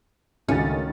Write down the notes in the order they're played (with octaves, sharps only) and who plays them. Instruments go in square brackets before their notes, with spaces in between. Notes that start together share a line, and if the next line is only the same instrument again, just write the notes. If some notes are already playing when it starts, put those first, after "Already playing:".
[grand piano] C#2 A3 F#4 [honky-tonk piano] D#3 A6 [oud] C#4